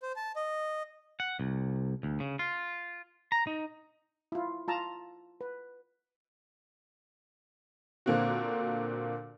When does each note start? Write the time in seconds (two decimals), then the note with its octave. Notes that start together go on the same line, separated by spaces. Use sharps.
0.02 C5
0.16 A5
0.36 D#5
1.20 F#5
1.40 C2
2.03 D2
2.20 C#3
2.39 F4
3.32 A#5
3.47 D#4
4.32 E4 F4
4.68 F4 A5 A#5
5.41 B4
8.06 A#2 D3 A#3 C4 F#4